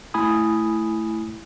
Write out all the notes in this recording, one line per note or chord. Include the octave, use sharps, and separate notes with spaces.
A3 E4 G#5 B5 D#6